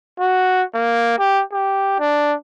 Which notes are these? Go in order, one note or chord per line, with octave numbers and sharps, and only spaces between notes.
F#4
A#3
G4
G4
D4